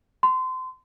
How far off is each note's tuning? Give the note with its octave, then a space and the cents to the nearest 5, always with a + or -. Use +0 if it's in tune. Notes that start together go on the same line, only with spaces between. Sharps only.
C6 -30